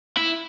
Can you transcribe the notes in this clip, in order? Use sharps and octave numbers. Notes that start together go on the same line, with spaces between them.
E4